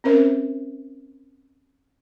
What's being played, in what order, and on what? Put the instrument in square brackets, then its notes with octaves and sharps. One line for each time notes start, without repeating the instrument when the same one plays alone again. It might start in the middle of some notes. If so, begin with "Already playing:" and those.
[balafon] C4 C#4 A#4 C5 E5